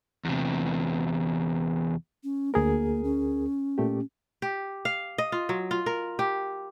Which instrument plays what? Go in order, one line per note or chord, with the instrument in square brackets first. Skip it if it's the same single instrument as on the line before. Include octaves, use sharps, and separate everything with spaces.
[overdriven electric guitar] E2 C3
[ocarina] C#4
[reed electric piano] D2 G#4 A#4 [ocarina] A#3
[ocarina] C#4
[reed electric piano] A#2 A3 G4
[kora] G4
F5
D#5
F4
F#3
F4
A#4
G4